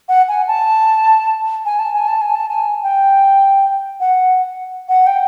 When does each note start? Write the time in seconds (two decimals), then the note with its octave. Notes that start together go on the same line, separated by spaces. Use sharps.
0.09 F#5
0.28 G#5
0.48 A5
1.66 G#5
1.79 A5
1.93 G#5
2.08 A5
2.21 G#5
2.35 A5
2.49 G#5
2.83 G5
4.00 F#5
4.89 F#5
5.07 G5